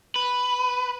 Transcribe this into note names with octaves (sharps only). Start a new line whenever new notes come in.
B4